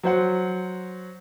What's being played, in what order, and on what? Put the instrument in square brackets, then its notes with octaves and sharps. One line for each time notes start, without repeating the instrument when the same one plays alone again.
[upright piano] F#3 C5 F#5